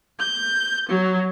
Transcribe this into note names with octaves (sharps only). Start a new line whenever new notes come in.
G6
F#3